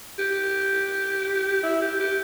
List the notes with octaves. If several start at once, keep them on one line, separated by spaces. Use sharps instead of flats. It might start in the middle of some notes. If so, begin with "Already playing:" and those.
G4
E4
G4
G4